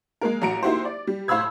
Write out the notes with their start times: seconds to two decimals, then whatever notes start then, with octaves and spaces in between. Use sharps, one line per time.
0.21 G#3 A#3 A#4
0.42 A1 F#4 A#5 C#7 D7
0.63 A#3 D#4 E4 F#4 G4 C5
0.85 D5
1.07 G3
1.28 A2 C5 F5 B5 E6 G#6